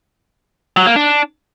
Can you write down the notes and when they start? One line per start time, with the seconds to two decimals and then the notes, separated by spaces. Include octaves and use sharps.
0.77 F#3
0.86 A#3
0.96 D4